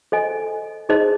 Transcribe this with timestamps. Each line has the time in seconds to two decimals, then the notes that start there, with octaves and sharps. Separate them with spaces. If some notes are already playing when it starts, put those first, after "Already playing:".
0.12 A4 C5 D#5 G#5
0.89 D#4 G#4 C5 D#5